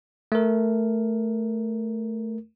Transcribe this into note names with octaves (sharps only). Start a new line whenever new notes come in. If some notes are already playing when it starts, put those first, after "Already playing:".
A3 A#4